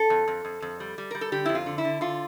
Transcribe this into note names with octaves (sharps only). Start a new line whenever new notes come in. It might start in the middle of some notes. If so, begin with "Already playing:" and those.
Already playing: A4
F2
F2
F2
F2
G3
G3
G3 A#4
A4
D3 G4
F2 E4
F4
D3
E4
D3
D3 F4